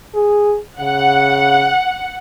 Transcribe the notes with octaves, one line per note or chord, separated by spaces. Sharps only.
G#4
C#3 F#5